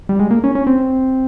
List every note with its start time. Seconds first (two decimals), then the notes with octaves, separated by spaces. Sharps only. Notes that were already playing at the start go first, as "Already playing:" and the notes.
0.09 G3
0.19 G#3
0.31 A#3
0.44 C#4
0.55 C#4
0.67 C4